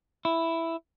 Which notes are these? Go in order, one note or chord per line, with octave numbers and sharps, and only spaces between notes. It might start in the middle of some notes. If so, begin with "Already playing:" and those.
E4